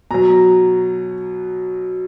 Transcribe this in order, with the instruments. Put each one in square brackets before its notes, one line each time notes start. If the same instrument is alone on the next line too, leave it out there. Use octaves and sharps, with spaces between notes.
[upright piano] B2 F#3 A#5